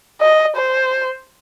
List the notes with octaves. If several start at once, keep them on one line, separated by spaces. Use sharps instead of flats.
D#5
C5